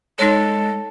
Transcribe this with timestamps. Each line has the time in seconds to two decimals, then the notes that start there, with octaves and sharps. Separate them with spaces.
0.19 G#3 D#4 A4 C#5